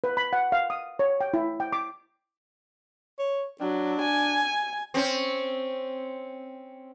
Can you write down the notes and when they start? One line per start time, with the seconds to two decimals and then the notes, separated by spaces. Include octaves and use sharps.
0.04 B4
0.17 B5
0.33 F#5
0.52 F5
0.70 D#6
0.99 C#5
1.21 G5
1.34 E4
1.60 G5
1.73 D6
3.19 C#5
3.61 F#3 D4
4.01 G#5
4.94 C4 C#4 C5